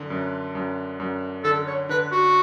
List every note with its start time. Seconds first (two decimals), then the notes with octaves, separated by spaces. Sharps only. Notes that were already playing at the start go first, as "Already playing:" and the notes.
Already playing: F#2 D3
0.10 F#2
0.55 F#2
1.00 F#2
1.44 D3 A4
1.67 C#5
1.89 D3 B4
2.12 F#4